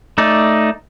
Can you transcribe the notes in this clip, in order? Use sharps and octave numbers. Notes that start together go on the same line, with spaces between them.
A3 D#4 D5